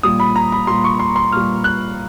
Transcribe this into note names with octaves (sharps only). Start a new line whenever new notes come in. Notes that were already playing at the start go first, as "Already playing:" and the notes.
A#2 G3 D#6
B5
A#5
B5
A#2 G3 C6
C#6
C6
C6
A#2 G3 F6
F#6